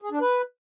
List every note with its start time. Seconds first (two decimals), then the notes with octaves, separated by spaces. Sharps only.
0.02 G#4
0.11 D4
0.21 B4